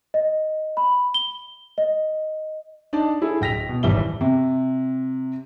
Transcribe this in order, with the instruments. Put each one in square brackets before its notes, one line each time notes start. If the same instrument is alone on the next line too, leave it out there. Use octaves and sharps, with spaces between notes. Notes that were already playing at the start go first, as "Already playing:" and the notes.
[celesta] D#5
B5
G7
D#5
[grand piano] D4 D#4 D5 A5
E4 G#4 A4
D1 G5 A#6 B6 F7
B2
D#1 G#1 E3 G3 E5 G7
[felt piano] C3